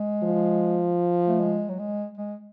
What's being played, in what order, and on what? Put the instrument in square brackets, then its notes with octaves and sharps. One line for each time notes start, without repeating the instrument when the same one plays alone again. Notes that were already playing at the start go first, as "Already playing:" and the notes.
Already playing: [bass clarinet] G#3
[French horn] F3
[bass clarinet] A3
G#3
F#3
G#3
G#3